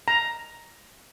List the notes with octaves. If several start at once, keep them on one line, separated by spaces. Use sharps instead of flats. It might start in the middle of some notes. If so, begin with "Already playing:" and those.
A#5